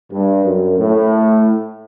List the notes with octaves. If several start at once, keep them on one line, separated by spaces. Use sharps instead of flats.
G2
F#2
A2